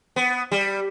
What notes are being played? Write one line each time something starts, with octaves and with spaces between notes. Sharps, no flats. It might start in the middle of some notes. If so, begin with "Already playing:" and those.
B3
G3